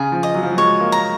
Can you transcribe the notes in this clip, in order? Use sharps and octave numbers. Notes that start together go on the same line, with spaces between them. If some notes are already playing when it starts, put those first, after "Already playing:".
Already playing: C#3 G#4
F3
D#5
F#3
F3
F#3
G#3 C#5
A#3
A#5